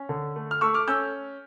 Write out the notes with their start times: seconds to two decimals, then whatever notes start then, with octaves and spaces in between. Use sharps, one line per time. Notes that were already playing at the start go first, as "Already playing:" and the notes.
Already playing: C#4
0.09 D3
0.36 A3
0.51 F6
0.61 A3 C#6 E6
0.74 D6 F6
0.88 C#4 E6 G6